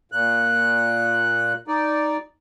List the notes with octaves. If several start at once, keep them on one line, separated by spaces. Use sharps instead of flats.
A#2 F#6
D#4 D5